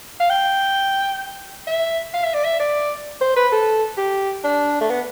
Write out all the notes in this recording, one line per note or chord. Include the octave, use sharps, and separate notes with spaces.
F5
G5
E5
F5
E5
D5
E5
D5
C5
B4
A4
G4
D4
A3
B3